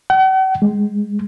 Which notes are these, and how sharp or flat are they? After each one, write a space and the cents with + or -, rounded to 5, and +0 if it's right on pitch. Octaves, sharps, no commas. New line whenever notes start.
F#5 +45
G#3 +0